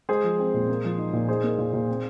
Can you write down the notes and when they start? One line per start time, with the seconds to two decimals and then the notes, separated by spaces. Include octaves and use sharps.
0.09 G#3 G#4 C5
0.24 F3
0.38 C4
0.54 A#2
0.69 A#3
0.84 F3
0.98 D#4
1.13 A#2
1.28 D#4 G#4 C5
1.44 A#3
1.58 A#2
1.73 A#2
1.88 C4